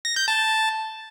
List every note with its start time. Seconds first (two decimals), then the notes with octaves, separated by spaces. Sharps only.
0.05 A#6
0.16 G6
0.28 A5